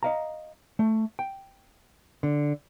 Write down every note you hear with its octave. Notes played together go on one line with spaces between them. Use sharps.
D#5 F5 A#5
A3
G5
D3